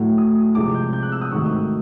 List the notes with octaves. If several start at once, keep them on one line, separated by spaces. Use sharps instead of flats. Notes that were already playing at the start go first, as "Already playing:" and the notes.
Already playing: A2 F#3 A3
D#6
C3 F3 G#3 D6
G6
G6
F#6
E6
D#6
G#2 D#3 F#3 A3 C#6